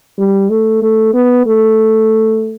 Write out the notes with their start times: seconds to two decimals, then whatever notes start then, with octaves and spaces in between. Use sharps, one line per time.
0.18 G3
0.50 A3
0.82 A3
1.14 B3
1.46 A3